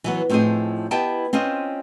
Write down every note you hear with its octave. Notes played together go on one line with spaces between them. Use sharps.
E3 F#3 B3
A2 F3 C4 C#4 D#4 G#4
B3 E4 G4 D#5 G5 A5
C4 C#4 F4 C5 D#5